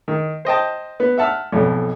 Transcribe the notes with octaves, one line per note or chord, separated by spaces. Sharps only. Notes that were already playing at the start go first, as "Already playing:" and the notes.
D#3
C5 D#5 G5 A5
B3
E5 F#5 A5 E6 F6
B1 F2 G#2 B2